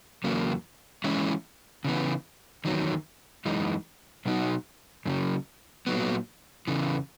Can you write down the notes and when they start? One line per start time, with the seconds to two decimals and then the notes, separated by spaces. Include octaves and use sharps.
0.24 E2 C#3 F#3 A#3
1.04 E3 G#3 C#4 E4
1.85 C#3 E3 B3
2.65 E2 D#3 F#3
3.45 F#2 E3 G#3 D#4
4.25 B2 F#3 B3 D#4 F#4
5.06 F#2 C#3 F#3
5.87 A#2 F#3 B3
6.68 E2 C#3 E3